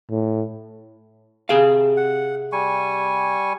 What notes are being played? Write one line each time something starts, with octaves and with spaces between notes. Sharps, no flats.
A2
C3 G#4 F5
F#5
G3 G#5 C#6